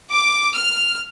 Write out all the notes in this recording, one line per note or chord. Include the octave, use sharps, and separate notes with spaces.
D6
F6